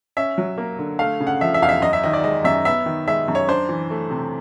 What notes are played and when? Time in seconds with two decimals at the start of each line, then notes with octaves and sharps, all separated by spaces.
0.17 C#4 E5
0.38 F#3
0.58 A#3
0.79 D3
0.99 A3 F5
1.20 C#3
1.27 F#5
1.41 F3 E5
1.54 E5
1.62 E2 F5
1.69 E5
1.82 F#2 D#5
1.93 E5
2.03 D#3 D#5
2.13 D5
2.24 G#3 D#5
2.45 F#2 E5
2.65 B3 E5
2.86 D#3
3.08 G#3 E5
3.28 F#2
3.35 C#5
3.48 D4 C5
3.69 E3
3.90 A3
4.10 C3